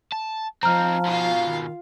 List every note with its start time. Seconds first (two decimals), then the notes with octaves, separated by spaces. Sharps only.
0.12 A5
0.63 F3 C4 D#4 A#5 F6
1.05 G#2 B2 F4 F5
1.45 D#3